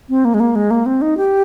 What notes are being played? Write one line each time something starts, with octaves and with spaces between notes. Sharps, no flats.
C4
A#3
G#3
A#3
G#3
A#3
C4
D#4
G4